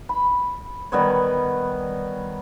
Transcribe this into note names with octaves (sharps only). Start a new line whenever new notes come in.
B5
D#3 G3 B3 C#5